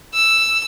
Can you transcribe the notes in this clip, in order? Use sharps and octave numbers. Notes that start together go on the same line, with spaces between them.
E6